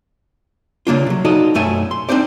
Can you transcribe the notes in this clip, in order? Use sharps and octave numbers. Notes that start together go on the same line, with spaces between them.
C#3 A#3 D4 F4
C3 F#3
D#4 F4 F#4 A4 D5 D#5
B1 F#2 A3 E5 G#5
C6
C4 D4 D#4 C5 D5